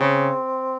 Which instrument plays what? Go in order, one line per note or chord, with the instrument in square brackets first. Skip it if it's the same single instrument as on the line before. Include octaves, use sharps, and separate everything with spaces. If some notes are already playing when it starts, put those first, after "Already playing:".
Already playing: [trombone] C#3 [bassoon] C4